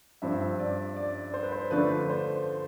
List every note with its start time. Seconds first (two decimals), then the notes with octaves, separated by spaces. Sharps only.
0.22 G2 F3 C4 E5
0.60 D5
0.96 D5
1.34 C5
1.43 B4
1.52 C5
1.71 D3 F3 A3 D4 B4
2.09 C5